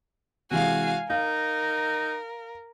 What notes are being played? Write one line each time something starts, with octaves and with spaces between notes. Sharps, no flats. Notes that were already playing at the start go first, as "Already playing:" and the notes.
C3 E3 G#3 F#4 F5 G#5
D#4 A#4 F5